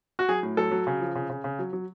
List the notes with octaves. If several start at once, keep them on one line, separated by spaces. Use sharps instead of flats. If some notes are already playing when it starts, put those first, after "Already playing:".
F#4
F#3 G#4
A2
F#3 A4
F#3
C#3
F3
C#3
C#3
C#3
F#3
F#3